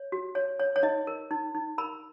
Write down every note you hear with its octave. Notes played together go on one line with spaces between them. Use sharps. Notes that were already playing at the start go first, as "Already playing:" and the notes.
Already playing: C#5
F#4
C#5
C#5
C#5
D#4 D#5
A#4
D#4
D#4
A#4 B5